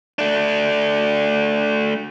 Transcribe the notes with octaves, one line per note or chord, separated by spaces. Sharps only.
A3 D4